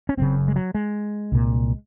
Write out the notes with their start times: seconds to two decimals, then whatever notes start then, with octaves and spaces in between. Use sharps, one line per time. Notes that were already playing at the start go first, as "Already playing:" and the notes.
0.09 C#4
0.17 F#1 F#2 C#3 C4
0.48 G#3
0.56 F#3
0.75 G#3
1.32 C2 A#2